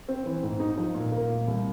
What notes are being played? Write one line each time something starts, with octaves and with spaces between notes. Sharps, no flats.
C4
E3
G#2
D#4
F3
A#2
A#3
A#2
C2